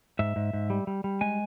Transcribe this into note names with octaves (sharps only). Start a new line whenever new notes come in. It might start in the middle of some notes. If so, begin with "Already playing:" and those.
G#2 E5
G#2
G#2
G3
G3
G3
G#3 G#5